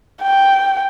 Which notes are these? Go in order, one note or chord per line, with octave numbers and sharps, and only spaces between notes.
G5